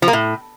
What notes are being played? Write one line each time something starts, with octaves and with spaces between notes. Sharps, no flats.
F3
A#3
A2